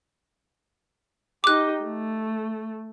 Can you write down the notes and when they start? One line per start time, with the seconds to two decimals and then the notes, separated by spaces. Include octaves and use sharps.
1.44 D#4 G4 D6 F#6
1.83 A3